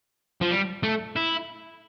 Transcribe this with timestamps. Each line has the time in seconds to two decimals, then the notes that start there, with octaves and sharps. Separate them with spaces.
0.41 F3
0.51 G3
0.83 A3
1.16 E4